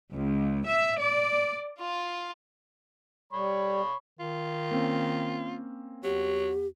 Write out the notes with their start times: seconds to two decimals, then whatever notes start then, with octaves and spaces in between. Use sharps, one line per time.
0.12 C#2
0.66 E5
0.98 D5
1.80 F4
3.33 G3 C#5 B5 C#6
4.19 D#3 F4
4.71 A#3 C4 C#4
6.04 E2 F#3 G4